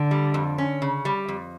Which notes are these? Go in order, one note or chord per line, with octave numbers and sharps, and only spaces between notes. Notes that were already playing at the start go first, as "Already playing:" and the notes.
Already playing: D3
G3
F2
C#4
C#3
G3
F2